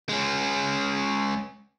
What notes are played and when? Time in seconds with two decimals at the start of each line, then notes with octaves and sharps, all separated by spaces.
0.09 G#3 C#4